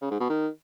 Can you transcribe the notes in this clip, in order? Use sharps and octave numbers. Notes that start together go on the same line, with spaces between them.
C#3
G#2
B2
D#3